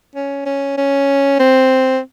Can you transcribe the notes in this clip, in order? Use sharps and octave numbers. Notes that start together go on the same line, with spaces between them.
C#4
C#4
C#4
C4